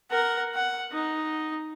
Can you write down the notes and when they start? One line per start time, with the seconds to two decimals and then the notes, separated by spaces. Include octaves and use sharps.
0.10 A#4 F#5
0.54 F#5
0.92 D#4